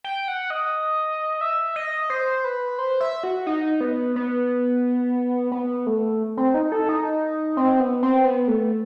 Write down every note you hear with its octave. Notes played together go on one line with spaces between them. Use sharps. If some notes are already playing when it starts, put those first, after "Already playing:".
G5
F#5
D#5
E5
D#5
C5
B4
C5
E5
F#4
D#4
B3
B3
B3
A3
C4
D#4
A4
D#4
C4
B3
C4
B3
A3